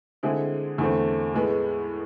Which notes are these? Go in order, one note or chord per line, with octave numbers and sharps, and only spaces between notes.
D3 G#3 C4 E4 G#4
E2 D3 A3 C4
A2 G#3 B3